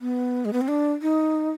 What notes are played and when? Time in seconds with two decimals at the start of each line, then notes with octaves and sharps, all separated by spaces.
0.01 B3
0.45 G#3
0.53 B3
0.61 C4
0.68 D4
1.02 D#4